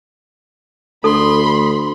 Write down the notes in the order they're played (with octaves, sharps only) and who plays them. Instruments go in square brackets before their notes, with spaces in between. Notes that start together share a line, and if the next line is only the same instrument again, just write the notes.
[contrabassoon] D2 [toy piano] A4 [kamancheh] B5 C6